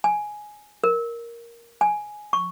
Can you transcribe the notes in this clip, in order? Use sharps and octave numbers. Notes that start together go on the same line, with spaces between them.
G#5
A#4
G#5
C#6